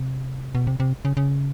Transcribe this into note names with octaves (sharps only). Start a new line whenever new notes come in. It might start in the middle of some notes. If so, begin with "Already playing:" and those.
Already playing: C3
B2
C3
C3
C#3
C#3